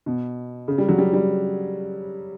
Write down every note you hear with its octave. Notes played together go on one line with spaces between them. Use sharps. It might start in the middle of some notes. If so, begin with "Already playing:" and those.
B2
C#3
G3
F#3
G3
G3